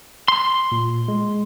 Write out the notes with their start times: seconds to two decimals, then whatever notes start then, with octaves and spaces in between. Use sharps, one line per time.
0.28 C6
0.72 A#2
1.08 G#3